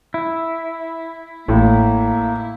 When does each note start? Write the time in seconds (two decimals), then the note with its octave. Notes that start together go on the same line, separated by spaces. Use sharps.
0.14 E4
1.48 A1 A2 A#3